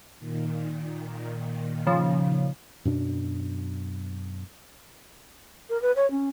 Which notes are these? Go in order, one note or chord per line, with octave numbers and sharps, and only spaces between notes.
A#2 D#3
C#3 F3
F#2 B2 D4
A#4
B4
C#5
C#4